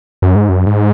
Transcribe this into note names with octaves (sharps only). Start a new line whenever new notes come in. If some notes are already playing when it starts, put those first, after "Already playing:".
F#2
G#2
F#2
G#2